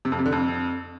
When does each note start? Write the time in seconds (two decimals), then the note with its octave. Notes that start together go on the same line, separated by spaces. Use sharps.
0.05 C3
0.12 F2
0.19 C3
0.26 D3
0.32 F2